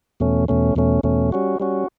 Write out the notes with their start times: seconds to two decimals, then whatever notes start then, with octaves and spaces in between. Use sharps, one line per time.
0.20 E2 B2 A3 C#4
0.48 E2 B2 A3 C#4
0.76 E2 B2 A3 C#4
1.03 E2 B2 A3 C#4
1.32 G3 C#4 F#4
1.60 G3 C#4 F#4